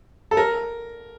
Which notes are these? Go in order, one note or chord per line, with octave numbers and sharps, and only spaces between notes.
A4
A#4